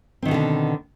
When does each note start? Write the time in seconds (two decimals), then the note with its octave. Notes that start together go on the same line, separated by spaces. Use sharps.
0.22 C4
0.25 D#3
0.28 B2
0.31 D3
0.34 B3